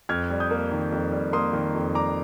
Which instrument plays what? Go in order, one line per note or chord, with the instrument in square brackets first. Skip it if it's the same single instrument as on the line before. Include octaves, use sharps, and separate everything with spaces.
[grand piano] F2 F6 G#6
G3
D#6 G6
A#3
D#3
F2
G3
A#3 C6 D#6
D#3
F2
G3 A#5 D6